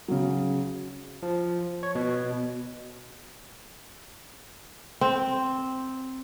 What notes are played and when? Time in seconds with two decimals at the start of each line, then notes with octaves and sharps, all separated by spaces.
0.08 C#3 F#3
1.23 F3
1.83 C#5
1.95 B2
5.01 C4